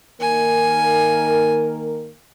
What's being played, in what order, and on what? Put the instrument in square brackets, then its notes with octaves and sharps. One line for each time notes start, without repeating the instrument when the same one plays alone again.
[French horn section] D#3 A#3 A#4 [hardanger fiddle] G#5